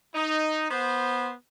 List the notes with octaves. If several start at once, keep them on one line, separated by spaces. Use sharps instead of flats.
D#4
B3 C5